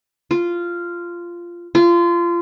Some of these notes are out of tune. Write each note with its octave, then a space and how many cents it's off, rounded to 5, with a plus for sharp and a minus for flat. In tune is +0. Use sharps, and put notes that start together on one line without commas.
F4 -10
F4 -25